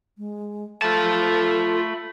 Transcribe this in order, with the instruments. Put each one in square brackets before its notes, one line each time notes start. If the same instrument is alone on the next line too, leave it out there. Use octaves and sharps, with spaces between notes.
[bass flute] G#3
[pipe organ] A3 B5 [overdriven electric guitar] F4 A5 [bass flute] A4